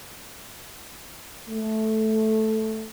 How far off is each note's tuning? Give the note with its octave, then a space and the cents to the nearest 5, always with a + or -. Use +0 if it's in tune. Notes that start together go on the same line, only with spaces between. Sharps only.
A3 -5